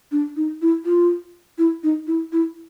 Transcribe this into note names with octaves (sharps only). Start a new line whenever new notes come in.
D4
D#4
E4
F4
E4
D#4
E4
E4